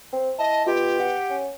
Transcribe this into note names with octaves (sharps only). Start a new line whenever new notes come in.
C4
E4 D#5 A5
B2 F4 G4
F#5
C#4